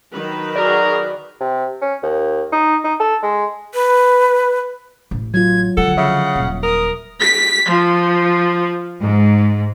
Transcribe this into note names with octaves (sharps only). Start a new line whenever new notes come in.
D#3 F#3 B4
F#4 G#4 A#4 D5
C3
C#4
D#2
D#4
D#4
A4
G#3
B4
A1
F#3 F4 G#6
D3 F3 A4 F#5
C#3 E5
D#1
A#4 D#6
B6
F3
G#2